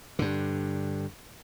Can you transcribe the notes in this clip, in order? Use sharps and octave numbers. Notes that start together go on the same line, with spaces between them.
G2 D3